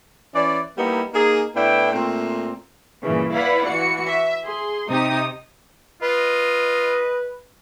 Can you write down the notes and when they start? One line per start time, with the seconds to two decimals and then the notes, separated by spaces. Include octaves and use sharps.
0.34 E3 C#4 D5
0.76 G3 A#3 B3 D#4 E4
1.14 A#3 D#4 G#4
1.55 A2 B3 D4 E4 G5
1.93 A#2 A3 C4
3.02 G2 A#2 C#3 E3
3.33 E4 B4 D5 F5 F#5 B5
3.67 E3 F#4 C#7
4.07 E5
4.44 G#4 C6
4.89 C3 D#4 G4 D#6
6.02 F4 B4 D#5